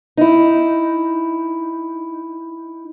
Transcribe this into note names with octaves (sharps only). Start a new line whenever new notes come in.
D#4 E4